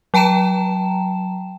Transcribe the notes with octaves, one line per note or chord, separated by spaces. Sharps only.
F#3 G5 A5 A#5 E7